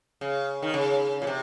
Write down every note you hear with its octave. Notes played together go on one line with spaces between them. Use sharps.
C#3
D#3
C#3
A#2
C3